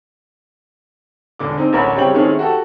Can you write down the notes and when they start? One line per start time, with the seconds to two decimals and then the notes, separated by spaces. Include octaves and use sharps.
1.39 E1 D3 D6
1.57 C4 D#4
1.73 A1 D2 A#4 C#5 B5
1.96 C#3 G3 C4 C#5 G5 F#7
2.14 D#3 G#3 A3 C4 C#4
2.39 F#4 G4 A4